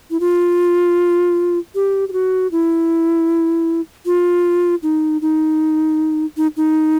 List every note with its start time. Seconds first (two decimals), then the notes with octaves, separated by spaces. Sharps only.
0.11 E4
0.20 F4
1.75 G4
2.09 G4
2.13 F#4
2.52 E4
4.06 F4
4.83 D#4
5.22 D#4
6.37 D#4
6.57 D#4